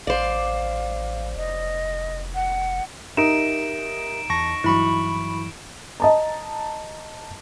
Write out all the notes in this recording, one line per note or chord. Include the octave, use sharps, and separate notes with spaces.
A1 C5 D5 F5
F1 D#5
F#5
D#4 G4 A#4 E5 D7 E7
E2 A5 C#6 A#6
G2 E3 F#3 E4 B5 C#6
D#5 A5 A#5